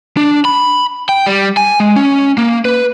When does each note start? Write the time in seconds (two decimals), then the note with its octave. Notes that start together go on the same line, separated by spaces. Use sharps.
0.17 D4
0.45 B5
1.09 G5
1.26 G3
1.57 G#5
1.80 G#3
1.96 C#4
2.38 A#3
2.65 B4